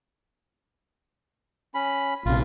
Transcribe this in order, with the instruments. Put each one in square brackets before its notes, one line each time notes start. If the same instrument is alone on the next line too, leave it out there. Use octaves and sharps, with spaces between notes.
[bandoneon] C#4 B5
[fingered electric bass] A#1 C3 [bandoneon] F4